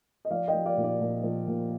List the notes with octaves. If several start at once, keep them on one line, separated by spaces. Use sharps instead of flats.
D#5
F3 D5 F5
D#5 G5
F3
D5 F5
A#2
D5
A#2
F3
A#2